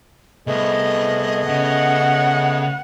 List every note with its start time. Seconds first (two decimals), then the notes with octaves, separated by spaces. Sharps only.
0.47 C2 A3 B3 G#4 D#5
1.49 C#3 F#5